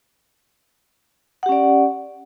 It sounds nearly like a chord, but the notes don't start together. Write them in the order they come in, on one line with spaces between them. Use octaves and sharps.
F#5 G4 C#4 D5